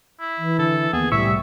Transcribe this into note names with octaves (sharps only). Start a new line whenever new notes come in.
E4
E3
D3 A4
D#2 B3 G#4
C2 A2 G3 E5 C#6 E6